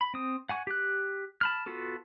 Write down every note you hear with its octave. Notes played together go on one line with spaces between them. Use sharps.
B5
C4 D#6
F#5 G#5 C#6
G4 F#6
A5 B5 F6
B3 F4 F#4 A4